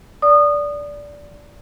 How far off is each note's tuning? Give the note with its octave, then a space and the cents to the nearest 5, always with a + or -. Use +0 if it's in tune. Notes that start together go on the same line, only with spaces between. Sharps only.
D5 -15 D#6 -25